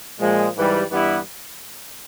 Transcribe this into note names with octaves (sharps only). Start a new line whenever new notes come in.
A#2 F3 G#3
G#2 E3 G3
G2 E3 G3 B3 E4